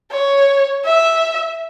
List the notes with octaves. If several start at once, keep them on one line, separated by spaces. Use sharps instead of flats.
C#5
E5